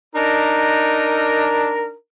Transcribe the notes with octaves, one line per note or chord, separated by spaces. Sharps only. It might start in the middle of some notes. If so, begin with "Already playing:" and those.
D4 D#4 A#4